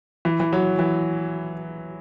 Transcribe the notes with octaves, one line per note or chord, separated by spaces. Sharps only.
E3
E3
F#3
E3